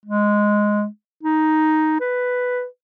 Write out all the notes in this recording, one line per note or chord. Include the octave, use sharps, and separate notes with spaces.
G#3
D#4
B4